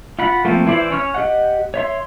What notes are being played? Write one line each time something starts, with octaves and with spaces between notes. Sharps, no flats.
F4 F#5 B5
F3 A3 A#3 C4 F4
E3 E4 C5 D5
C#4 C#5 F6
G4 D#5 F#5
C#5 E5 C6